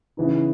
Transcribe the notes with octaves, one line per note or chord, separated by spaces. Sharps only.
C#3 E3 B3 D#4